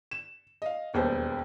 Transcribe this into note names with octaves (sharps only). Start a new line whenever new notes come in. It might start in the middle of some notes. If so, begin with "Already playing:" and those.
E7
D#5 F5
E1 D#2 G3 B3 G4 C5